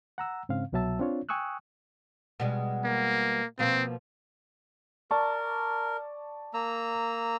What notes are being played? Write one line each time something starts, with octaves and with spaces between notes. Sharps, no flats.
F#5 A#5 E6
G#2 C#3 C4 F5
C2 B2 F#3 E5 A5 E6
C4 D4 F4 C#5
G5 G#5 C#6 D#6 E6 F#6
B2 G3 G#3
A#3
B2 F3 A#3 C4
A#4 D5 A5 C#6
A#3 A#5 E6